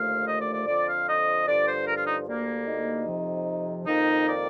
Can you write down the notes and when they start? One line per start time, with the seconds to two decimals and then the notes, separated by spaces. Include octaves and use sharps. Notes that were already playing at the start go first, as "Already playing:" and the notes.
Already playing: D#2 D3 F3 A3 F5
0.27 D#5
0.40 D5
0.54 D5
0.66 F2 D3 F3 D5
0.86 F5
1.07 D#5
1.46 G2 D3 F3 D5
1.67 C5
1.87 A#4
1.96 F4
2.06 D#4
2.27 D2 D3 G3 A#3
2.66 D#4
3.06 F2 C3 F3
3.86 F2 D#3 A#3 D#4
4.26 D5